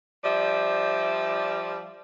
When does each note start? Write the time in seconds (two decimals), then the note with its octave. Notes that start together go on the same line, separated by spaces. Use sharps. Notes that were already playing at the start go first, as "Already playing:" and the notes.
0.24 F3 G3 D5 E5